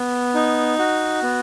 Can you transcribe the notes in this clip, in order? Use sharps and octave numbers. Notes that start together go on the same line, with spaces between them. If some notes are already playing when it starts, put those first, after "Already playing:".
Already playing: B3
D#4
F#4
B3